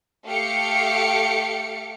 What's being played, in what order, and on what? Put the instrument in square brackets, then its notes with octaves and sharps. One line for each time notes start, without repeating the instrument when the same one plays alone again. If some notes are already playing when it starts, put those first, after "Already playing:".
[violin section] A3 G4 F5 C#7